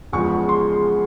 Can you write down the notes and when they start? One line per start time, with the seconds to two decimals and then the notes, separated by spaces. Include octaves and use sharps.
0.12 E2 C#3 F3 G#3 C#6
0.49 C6